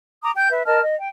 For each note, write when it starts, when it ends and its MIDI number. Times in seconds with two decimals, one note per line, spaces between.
0.24 0.32 82
0.24 0.32 86
0.24 0.32 87
0.36 0.49 79
0.36 0.49 91
0.51 0.62 71
0.51 0.62 76
0.66 0.81 70
0.66 0.81 75
0.66 0.81 81
0.66 0.81 89
0.84 0.95 75
0.99 1.09 79